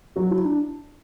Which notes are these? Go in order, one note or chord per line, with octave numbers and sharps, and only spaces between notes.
F#3 F#4
E4
D4